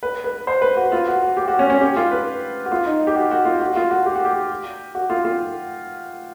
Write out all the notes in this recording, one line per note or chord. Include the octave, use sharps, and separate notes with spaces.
B4
B4
C5
B4
F#4
F4
F#4
F#4
G4
F#4
C#4
C#4
G4
F4
B4
F#4
F4
D#4
G4
F#4
F#4
F4
F#4
F4
F#4
G4
F#4
G4
F#4
F4
F4